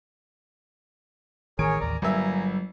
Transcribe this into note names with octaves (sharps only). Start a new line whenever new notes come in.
A1 D#3 G#4 A#4 C#5 G#5 D7
A1 D#2 A#4 D5 A#5
G1 F#3 G3 A#3 E5 G#5 A#5